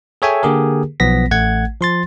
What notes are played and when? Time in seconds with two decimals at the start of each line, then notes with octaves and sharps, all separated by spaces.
0.22 G#4 A4 C#5 E5 G5 G#5
0.43 D3 A#3 G4 G#4 A#4
1.00 B1 F3 B3 A#6 B6
1.31 A1 A3 F#5 G#6
1.81 F3 C6 A6